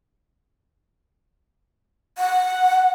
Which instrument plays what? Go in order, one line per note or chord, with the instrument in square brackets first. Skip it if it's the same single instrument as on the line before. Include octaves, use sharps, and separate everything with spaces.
[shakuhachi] F#5